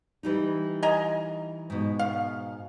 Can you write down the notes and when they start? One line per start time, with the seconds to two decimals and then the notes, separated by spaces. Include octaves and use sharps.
0.23 E3 G3 D#4
0.83 D#5 G#5 A#5
1.70 G#2 B2
1.99 F5